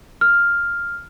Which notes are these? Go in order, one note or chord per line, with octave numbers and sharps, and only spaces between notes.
F6